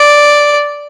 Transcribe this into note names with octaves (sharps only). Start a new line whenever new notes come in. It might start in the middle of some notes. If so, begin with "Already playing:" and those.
Already playing: D5